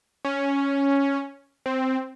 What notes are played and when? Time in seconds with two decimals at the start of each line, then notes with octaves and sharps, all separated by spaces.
0.25 C#4
1.66 C4